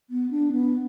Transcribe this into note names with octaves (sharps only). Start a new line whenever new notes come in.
B3
D4
B3